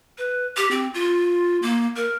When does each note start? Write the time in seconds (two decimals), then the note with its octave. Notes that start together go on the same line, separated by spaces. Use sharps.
0.18 B4
0.57 G4
0.71 C4
0.94 F4
1.62 A#3
1.96 A#4